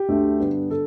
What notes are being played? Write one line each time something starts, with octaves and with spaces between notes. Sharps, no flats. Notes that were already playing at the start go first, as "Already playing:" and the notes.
Already playing: G4
D2 D3 A3
G2 D3 B3 D4
D3 A4